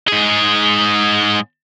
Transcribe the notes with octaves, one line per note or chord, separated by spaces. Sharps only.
G#2 G#4